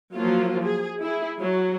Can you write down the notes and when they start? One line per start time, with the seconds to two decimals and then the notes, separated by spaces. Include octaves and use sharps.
0.13 F3 F#3 A#3 F4
0.61 G#4
1.00 E4 G#4
1.37 F#3 F#4